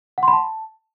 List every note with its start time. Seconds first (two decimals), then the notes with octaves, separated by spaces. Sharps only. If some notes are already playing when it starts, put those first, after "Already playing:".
0.18 F#5
0.23 C6
0.28 B5
0.33 A5